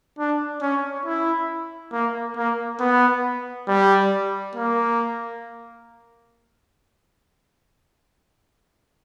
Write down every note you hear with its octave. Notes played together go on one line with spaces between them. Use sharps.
D4
C#4
E4
A#3
A#3
B3
G3
A#3